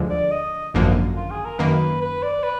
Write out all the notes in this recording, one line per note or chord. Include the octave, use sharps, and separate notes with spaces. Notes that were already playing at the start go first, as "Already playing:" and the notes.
Already playing: D2 D3 F3 G#3
D5
D#5
G#1 F#2 D3 F3 A#3
F4
G#4
A#4
F#2 D#3 A#3 B4
B4
D5
B4